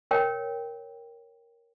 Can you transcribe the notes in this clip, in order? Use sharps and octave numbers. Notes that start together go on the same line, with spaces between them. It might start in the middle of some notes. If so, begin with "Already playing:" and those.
A#4 C#5 G5